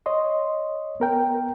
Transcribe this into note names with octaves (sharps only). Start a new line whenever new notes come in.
C#5 D#5 C6
B3 A#4 G5